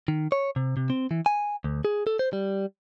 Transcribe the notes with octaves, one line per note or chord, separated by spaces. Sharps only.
D#3
C#5
C3
C3
C4
E3
G#5
D2
G#4
A4
C5
G3